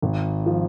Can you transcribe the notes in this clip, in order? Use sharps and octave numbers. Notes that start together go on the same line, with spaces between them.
G#1
F3